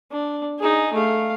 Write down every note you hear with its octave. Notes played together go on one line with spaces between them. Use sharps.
D4
D#4 G#4
A3 F5